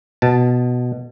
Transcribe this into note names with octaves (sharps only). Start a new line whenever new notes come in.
B2 A5